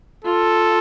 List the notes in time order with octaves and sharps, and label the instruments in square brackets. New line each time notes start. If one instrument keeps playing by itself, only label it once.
[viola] F4 [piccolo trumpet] A4